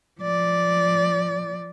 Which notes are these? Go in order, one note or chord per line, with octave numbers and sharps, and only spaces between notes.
F3 D5